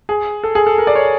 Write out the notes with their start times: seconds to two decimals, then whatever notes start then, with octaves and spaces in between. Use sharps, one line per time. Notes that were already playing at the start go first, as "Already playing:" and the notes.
0.09 G#4
0.44 A4
0.55 G#4
0.67 A4
0.78 A#4
0.87 D5
0.95 C#5